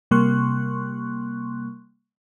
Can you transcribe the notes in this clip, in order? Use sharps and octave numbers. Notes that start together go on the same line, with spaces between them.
C3 G3 A#3 C6 C#6 F#6